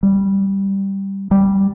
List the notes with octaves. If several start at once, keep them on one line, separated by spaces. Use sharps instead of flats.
G3
G3